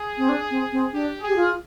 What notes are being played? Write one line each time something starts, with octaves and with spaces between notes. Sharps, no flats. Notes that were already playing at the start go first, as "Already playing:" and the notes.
Already playing: G#4
C4
D4
C4
C4
D4 G4
G#4
G4
F4